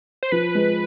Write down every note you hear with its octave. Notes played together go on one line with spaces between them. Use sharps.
C5
F3 B4
G#3